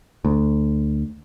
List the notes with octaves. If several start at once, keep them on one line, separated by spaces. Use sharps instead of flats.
D2